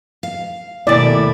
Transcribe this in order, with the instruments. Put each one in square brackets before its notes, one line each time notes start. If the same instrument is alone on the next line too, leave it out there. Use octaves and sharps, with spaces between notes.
[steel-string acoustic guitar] F5
[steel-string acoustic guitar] D#2 E4 [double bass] B2 A3 [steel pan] D5